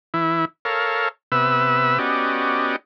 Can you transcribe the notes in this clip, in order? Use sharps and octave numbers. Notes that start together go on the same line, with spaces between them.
E3 E4
A4 A#4 C#5 F5
C3 B3 B4 E5 E6
B3 C#4 F#4 G4 D5 D#5